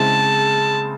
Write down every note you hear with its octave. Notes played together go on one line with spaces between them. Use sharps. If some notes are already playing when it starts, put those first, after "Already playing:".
Already playing: C#3 G#3 C4 E4 A5